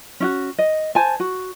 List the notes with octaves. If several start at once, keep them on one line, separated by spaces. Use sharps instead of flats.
C#4 E4 F#4
D#5
C5 G#5 A5
F#4